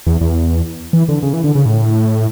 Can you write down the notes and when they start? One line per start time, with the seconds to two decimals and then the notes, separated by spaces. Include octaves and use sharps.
0.07 E2
0.21 E2
0.93 E3
1.09 D3
1.23 C#3
1.33 E3
1.44 D3
1.55 C#3
1.66 A2